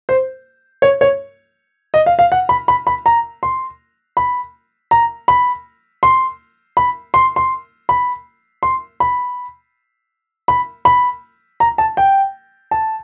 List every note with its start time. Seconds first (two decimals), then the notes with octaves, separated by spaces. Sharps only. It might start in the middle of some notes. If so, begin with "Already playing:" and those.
0.09 C5
0.82 C#5
1.01 C#5
1.94 D#5
2.06 F5
2.19 F5
2.32 F#5
2.49 B5
2.68 B5
2.87 B5
3.06 A#5
3.43 C6
4.17 B5
4.91 A#5
5.28 B5
6.03 C6
6.77 B5
7.14 C6
7.36 C6
7.89 B5
8.63 C6
9.00 B5
10.48 B5
10.85 B5
11.60 A#5
11.78 A5
11.97 G5
12.71 A5